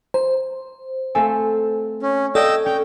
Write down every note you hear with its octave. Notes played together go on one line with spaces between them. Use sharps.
C5 A#5
A3 C4 A4 F5 G#5
C#4
A4 D5 D#5 F5 G5 E6 G#6
C#4 G5